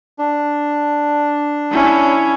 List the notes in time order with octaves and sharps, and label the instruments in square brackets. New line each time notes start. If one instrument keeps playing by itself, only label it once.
[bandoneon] D4
[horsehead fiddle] C#4 E4